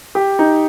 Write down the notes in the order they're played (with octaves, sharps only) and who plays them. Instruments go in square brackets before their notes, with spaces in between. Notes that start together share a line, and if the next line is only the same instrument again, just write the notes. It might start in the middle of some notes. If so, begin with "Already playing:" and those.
[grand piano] G4
D#4